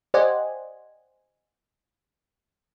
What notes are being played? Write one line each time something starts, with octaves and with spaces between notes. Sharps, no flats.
G4 C5 D5 D#5 F#5 G#5